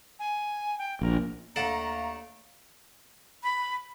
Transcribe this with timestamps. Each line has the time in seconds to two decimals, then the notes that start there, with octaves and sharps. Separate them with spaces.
0.19 G#5
0.79 G5
1.02 A#1 A#4
1.56 D#2 A3 D4 A4 F5 F#5 A#5
3.43 B5